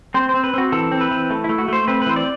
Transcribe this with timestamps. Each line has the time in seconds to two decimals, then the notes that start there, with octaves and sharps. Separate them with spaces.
0.14 C4 C5
0.29 C4 C5
0.44 B4
0.54 C4 F#4
0.72 E3 A4
0.92 C4
1.01 B4
1.11 E3
1.30 A3
1.44 E4
1.49 A3
1.58 F#4
1.68 A3 C5
1.88 C4 B4
2.02 B4
2.06 E3 C5
2.16 D5